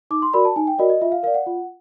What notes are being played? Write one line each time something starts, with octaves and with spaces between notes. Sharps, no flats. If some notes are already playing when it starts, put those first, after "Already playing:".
D#4 D6
C6
F#4 A#4 D5 B5
A5
D#4 G#5
G5
F#4 A#4 D5 D#5
D#5
F4 E5
F5
A#4 D5 F5
F#5
F4